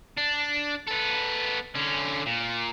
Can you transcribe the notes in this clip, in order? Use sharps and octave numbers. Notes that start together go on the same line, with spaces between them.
D4
B3 A4
D3 C#4
A#2